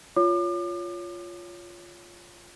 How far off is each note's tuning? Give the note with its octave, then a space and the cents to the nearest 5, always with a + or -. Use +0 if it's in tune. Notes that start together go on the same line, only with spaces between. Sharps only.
F4 +0 C#5 +15 D6 +40